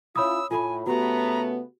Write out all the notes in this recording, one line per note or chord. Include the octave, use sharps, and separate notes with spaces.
C#4 E4 F4 C#5 B5 D#6 E6
A2 F4 A4 G#5 B5
C#3 A3 B3 F#4 G4 A#5